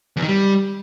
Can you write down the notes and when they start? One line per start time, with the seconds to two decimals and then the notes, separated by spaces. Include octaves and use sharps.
0.17 E2
0.22 D#3
0.28 G3